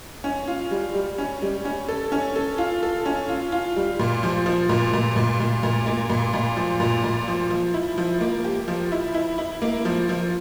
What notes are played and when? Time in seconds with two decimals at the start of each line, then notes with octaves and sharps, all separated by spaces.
0.24 C#4
0.47 F4
0.71 G3
0.94 G3
1.18 C#4
1.42 G3
1.65 C#4
1.88 A4
2.12 C#4
2.36 A4
2.58 F4
2.83 A4
3.06 C#4
3.29 F4
3.52 F4
3.76 G3
3.99 A#2
4.23 F3
4.46 F3
4.69 A#2
4.93 A#2
5.16 A#2
5.40 A#2
5.63 A#2
5.86 A#3
6.10 A#2
6.33 A#2
6.57 F3
6.80 A#2
7.04 A#2
7.28 F3
7.50 F3
7.74 E4
7.98 F3
8.21 A#3
8.44 G4
8.68 F3
8.92 E4
9.15 E4
9.38 E4
9.62 A#3
9.85 F3
10.09 F3